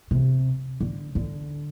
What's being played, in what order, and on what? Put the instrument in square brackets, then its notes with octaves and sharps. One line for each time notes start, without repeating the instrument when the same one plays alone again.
[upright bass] C3
D3
D3